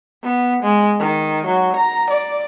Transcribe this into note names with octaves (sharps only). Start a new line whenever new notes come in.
B3
G#3
D#3
F#3
A#5
D5